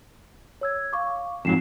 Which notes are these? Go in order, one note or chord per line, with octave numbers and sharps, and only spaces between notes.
C#5 E6 G#6
F5 C#6 D6
F2 G#2 F#3 C7 E7